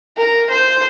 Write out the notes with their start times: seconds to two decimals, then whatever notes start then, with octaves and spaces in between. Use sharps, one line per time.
0.17 A#4
0.51 C5